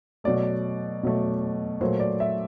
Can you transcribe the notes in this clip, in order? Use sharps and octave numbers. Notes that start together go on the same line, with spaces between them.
B2 F#3 A3 D5
B2 F#3 A3
A#2 F#3 A3 C5
D5
E5